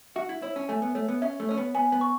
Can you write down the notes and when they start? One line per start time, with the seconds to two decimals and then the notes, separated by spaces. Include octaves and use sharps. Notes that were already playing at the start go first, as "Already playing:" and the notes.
0.16 F#4 E5
0.29 E4
0.42 E4 C#5
0.56 C#4
0.68 A3 G#5
0.82 B3
0.95 A3 C#5
1.08 B3
1.22 C#4 E5
1.40 A3
1.49 C#4 C#5
1.58 B3
1.75 B3 G#5
1.92 B3
2.01 C#6